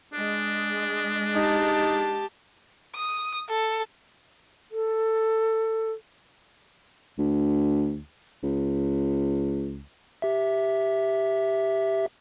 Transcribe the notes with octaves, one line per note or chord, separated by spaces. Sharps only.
G#3 D4 G#4 D#5
D#4 G4 A5
D#6
A4
A4
D2
C#2
G4 E5